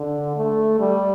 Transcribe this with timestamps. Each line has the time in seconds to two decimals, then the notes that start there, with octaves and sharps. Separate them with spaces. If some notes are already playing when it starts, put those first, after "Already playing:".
Already playing: D3
0.37 A3
0.80 G3